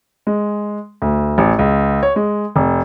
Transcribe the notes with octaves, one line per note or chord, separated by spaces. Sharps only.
G#3
D2
A1
C#2
C#5
G#3
F1